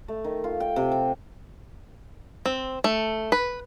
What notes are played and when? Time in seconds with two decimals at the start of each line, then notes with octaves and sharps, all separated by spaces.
0.08 A3
0.24 D#3
0.44 F4
0.60 G5
0.76 C3
0.92 G5
2.46 C4
2.84 A3
3.32 B4